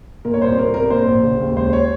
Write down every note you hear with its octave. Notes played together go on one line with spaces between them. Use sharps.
A#2 A#4
C#5
C2 C5
C2 A#4
C2 A#4
A#2 C5
A#1
C#3
D#2
C#2 C5
C#5